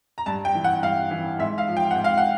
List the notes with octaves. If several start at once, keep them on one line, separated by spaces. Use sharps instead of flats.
A#5
G2 A5
G5
E3
F#5
G2 F5
E3
G#2 E5
F5
F3
G5
G#2 F#5
F5
F#5